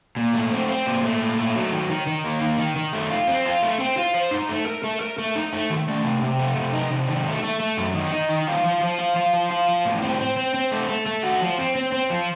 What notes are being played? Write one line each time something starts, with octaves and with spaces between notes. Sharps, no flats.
A#2
A3
C4
C4
A#2
A3
A#2
A3
F#3
D#3
D#3
D#3
A#3
D#3
D#3
D#3
A3
F4
C4
F4
A3
C4
F4
C5
D#4
A3
A#4
A3
A#4
A3
D#4
A3
D#3
A3
C3
C3
A3
C3
D#4
C3
D#3
A3
A3
A3
F#2
D#3
D#4
D#3
F4
F3
F3
F4
F4
F3
F4
F3
A2
C4
C4
C4
C4
A3
A3
A3
F#4
F3
C4
C4
C4
F3